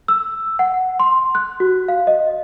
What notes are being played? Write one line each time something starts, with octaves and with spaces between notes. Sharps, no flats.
E6
F#5
C6
F#6
F#4
F5
D#5